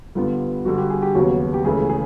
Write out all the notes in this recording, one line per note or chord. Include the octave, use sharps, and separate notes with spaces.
G2 D3 G3 B3 F4
G2 D3 G3 F#4
G4
G#4
G4
D#2 C#3 F#3 B3 F#4
G4
C#2 C#3 E3 A3 G#4
G#4